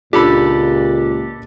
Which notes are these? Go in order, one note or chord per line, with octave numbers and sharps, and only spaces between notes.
C#2 A#2 D4 F4 G4 A4 B5